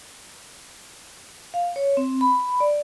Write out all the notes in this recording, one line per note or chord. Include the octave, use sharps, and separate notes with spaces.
F5
C#5
C4
B5
D5